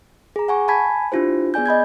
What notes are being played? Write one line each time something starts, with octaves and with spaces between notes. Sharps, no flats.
G#4 A#5
F#5 G#5 C#6
G#5 A5 B5 G#6 B6
D4 E4 F4 G4 C5
B3 G#4 D5 G#5 G6
D#5 B5 G6 G#6